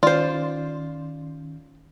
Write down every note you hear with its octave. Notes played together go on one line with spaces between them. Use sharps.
D#3 C#4 F4 C5 D5